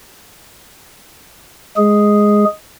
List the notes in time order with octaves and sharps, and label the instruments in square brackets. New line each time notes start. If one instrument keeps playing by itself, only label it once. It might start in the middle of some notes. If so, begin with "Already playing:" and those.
[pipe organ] G#3 G#4